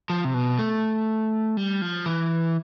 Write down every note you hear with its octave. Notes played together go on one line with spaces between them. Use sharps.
F3
C3
B2
A3
G3
F3
E3